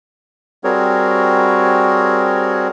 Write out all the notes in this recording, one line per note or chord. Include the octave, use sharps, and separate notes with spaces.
G3 C4 F#4 G#4 A#4 C#5